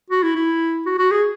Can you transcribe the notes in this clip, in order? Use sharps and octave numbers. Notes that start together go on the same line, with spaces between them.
F#4
E4
E4
F#4
F#4
G#4